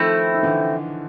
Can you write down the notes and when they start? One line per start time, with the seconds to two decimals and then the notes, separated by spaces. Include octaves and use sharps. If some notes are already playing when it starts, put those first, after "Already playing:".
Already playing: D#3 F3 A3 C4 E4
0.35 D#3
0.43 D3 E3